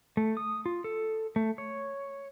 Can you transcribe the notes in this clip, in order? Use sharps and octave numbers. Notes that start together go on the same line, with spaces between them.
A3
D#6
F4
A4
A3
C#5